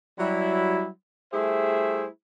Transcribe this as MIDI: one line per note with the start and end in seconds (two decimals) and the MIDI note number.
0.18 0.87 54
0.18 0.87 55
0.18 0.87 64
1.32 2.06 55
1.32 2.06 57
1.32 2.06 64
1.32 2.06 68
1.32 2.06 72
1.32 2.06 76